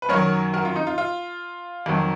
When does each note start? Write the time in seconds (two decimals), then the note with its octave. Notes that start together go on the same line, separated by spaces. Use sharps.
0.02 B4
0.09 F#2 D#3 F#3 A#4 C#5
0.53 F#4 A#4
0.65 F4
0.76 D#4
0.87 F4
0.98 F4
1.86 F2 D#3 F#3